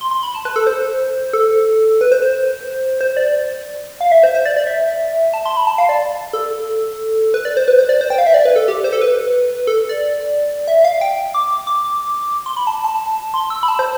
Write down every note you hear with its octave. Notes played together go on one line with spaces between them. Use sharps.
C6
C6
B5
A5
B4
A4
C5
A4
B4
C5
C5
C5
D5
F5
E5
C5
C5
D5
D5
E5
A5
C6
B5
A5
F5
D5
A4
B4
D5
C5
B4
C5
D5
C5
G5
F5
E5
D5
B4
A4
G4
C5
A4
B4
A4
D5
E5
F5
G5
D6
D6
C6
B5
A5
A5
C6
E6
B5
A5
C5